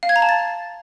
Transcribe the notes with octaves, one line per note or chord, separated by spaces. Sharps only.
F5
G#6
A#5
A5
A6